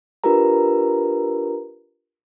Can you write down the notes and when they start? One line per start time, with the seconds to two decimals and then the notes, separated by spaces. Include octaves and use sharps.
0.24 D4 F4 G4 A#4 B4 A#5